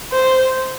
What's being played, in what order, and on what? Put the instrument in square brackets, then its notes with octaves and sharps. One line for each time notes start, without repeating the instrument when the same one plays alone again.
[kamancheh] C5